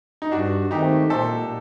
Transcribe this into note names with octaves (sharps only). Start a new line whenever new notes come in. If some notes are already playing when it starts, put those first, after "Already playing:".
D#4
G2 D4 F#4
D#3 A3 C4 D#4 G4
A#2 A4 C5